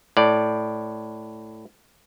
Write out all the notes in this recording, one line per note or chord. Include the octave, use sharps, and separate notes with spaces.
A2 D5